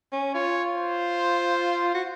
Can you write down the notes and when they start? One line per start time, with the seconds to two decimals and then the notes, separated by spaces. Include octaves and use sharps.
0.13 C#4
0.34 F4 C#5
0.76 C5
1.94 F#4